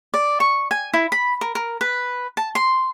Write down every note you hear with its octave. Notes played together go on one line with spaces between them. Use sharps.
D5
C#6
G#5
E4
B5
A#4
A#4
B4
A5
C6